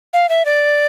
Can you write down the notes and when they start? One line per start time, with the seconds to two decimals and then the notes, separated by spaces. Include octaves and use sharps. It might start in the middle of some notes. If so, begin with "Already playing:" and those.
0.13 F5
0.29 E5
0.45 D5